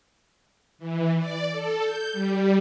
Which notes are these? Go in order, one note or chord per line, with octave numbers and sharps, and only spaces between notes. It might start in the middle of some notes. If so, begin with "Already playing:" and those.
E3
D5
A4
G6
G3